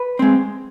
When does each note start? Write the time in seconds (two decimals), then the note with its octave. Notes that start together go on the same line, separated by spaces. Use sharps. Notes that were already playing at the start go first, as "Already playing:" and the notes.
Already playing: B4
0.19 G#3 C4